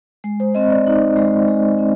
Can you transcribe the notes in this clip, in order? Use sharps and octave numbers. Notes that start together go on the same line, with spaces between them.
G#3
C5
C4 D#5
D5
D#4
G#3
G#3
C4